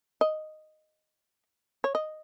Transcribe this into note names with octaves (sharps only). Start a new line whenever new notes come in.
D#5
C#5
D#5